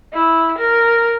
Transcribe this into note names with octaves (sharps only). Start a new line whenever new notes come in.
E4
A#4